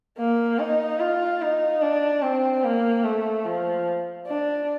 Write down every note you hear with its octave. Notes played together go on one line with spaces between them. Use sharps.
A#3
D#4
F4
D#4
D4
C4
A#3
A3
F3
D4